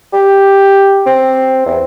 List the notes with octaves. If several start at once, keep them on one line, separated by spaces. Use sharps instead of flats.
G4
C4
E2